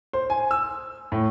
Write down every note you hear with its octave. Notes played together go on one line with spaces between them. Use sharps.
C5
G#5
E6
A2